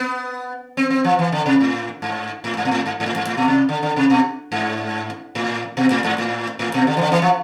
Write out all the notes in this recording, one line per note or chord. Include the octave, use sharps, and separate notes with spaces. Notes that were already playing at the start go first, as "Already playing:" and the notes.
Already playing: B3
C4
C4
F3
E3
D3
C3
A2
G#2
A2
G#2
B2
A2
G#2
G#2
A2
G#2
A2
B2
C3
D3
D3
C3
B2
G#2
A2
B2
A2
G#2
A2
A2
B2
D3
E3
D3
E3
F3